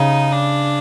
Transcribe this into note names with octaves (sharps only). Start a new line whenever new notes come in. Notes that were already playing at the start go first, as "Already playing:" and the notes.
Already playing: C#3 D#4
D4